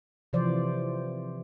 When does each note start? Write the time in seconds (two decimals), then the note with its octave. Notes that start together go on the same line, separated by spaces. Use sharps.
0.33 C3 E3 F3 C5 D5